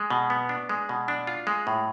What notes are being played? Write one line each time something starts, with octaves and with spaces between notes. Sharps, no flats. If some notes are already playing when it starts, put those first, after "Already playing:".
Already playing: G#3
B2
B3
D4
G#3
B2
D4
F4
G#3
A2